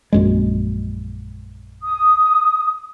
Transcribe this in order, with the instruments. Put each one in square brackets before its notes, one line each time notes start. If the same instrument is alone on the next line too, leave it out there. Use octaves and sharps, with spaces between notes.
[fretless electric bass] A#1 F#2 G#3
[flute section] D#6